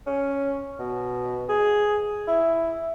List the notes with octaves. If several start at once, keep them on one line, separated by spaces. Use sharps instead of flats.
C#4
B2
G#4
E4